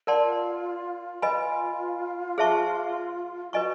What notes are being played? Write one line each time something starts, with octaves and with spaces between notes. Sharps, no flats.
F4 A#4 D5 F#5 A5 C6
F4 B4 D#5 G#5 B5
G#4 C5 E5 A5 C#6
F#4 B4 D#5 G#5 C#6